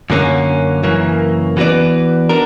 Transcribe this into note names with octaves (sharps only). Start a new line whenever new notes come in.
F#2 D3 F#3 A#3 C#4
F#2 C#3 E3 A#3
E3 B3 F#4 B4 D5
B3 D4 A#4